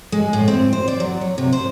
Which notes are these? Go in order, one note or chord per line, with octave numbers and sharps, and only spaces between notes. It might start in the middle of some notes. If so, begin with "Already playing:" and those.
G#3
A2
C4
C5
D5
F#3
C#5
C3
C5